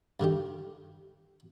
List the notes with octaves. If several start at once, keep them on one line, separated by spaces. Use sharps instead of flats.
G2 D3 D#3 G4